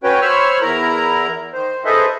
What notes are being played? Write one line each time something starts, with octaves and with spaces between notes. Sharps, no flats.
C#4 F#4 B4 C#5 G5
C5 C#5 B5 C#6 E6 F6
E2 E4 A#4 A#5
D#3 C5
G#4 A4 B4 C5 D#5 E5